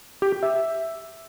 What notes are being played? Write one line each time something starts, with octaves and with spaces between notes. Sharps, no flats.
G4
G4
E5